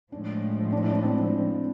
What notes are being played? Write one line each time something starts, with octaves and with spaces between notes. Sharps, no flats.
A2 F3 G#3 D4
D4
E4
D4
C4
C4